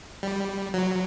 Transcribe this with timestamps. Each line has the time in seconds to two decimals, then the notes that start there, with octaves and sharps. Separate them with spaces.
0.23 G3
0.74 F#3